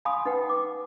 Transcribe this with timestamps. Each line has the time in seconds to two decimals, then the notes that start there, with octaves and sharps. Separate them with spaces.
0.05 F5 G#5 B5 C6 D#6
0.25 D#4 B4 F#5 G5
0.49 D6